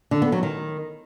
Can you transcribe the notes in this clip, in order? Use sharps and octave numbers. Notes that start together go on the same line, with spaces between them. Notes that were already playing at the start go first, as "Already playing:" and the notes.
D3
B3
F#3
D#3